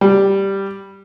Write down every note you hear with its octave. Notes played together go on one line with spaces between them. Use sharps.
G3